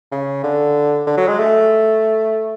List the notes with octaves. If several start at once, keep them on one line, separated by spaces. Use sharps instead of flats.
C#3
D3
D3
F#3
G#3
A3